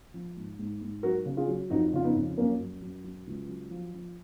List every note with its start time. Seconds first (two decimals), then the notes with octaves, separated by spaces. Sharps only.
0.14 F3
0.37 G#2
0.59 G#2
0.81 G#2
1.03 F#3 F#4 A#4
1.26 C#3
1.37 F4 G#4
1.48 F#3
1.70 F2 D#4 F#4
1.93 C#3 F4
2.04 B3 D#4
2.15 F2
2.37 F#2 A#3 C#4
2.60 F#2
2.82 F#2
3.04 F#3
3.27 C#2
3.49 F#3
3.71 F3
3.94 F3